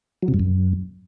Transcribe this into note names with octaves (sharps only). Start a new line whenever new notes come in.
F#3
C3
G2
F#2